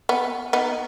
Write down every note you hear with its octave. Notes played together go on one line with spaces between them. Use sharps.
B3
B3 D#4